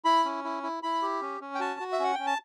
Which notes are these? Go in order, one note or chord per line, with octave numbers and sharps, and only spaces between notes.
E4 B5
C#4
E4
E4
E4 B5
G4
C#4
C#4
G5
F#4 A5
F#4
E5
C#4 F#5
C#4 G5
A5